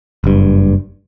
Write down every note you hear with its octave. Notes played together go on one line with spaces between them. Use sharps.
F#1 G2